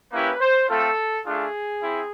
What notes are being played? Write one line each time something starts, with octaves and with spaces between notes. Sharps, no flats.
A#3 C#4 E4 G4 B4
C5
A3 C4 F4 A4
A3 D4 F4 G#4
C4 E4